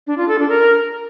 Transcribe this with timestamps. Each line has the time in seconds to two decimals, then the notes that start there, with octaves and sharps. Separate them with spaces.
0.07 D4
0.18 F4
0.28 A4
0.39 D4
0.49 A#4